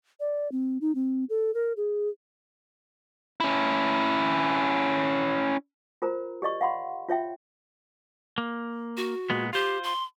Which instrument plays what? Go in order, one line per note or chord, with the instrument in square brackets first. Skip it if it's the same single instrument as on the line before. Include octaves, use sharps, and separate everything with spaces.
[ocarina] D5
C4
D#4
C4
A4
A#4
G#4
[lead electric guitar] C#4 E4
[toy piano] F4 A#4 C5 A#5
G4 D5 D#5 C#6
F5 F#5 B5 C6
F4 C#5 E5 G5
[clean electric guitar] A#3
[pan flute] F#4
[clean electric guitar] A#2 G#3 B3
[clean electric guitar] F4 C5 [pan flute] G4
[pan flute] C6